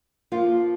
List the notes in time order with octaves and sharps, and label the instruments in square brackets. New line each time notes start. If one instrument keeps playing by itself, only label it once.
[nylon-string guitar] F3 A#3 F4